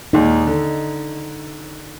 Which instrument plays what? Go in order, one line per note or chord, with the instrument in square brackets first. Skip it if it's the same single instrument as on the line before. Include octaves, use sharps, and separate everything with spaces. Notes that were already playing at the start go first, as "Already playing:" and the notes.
[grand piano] D#2 A#2 G#3 [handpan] D#4
[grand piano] D3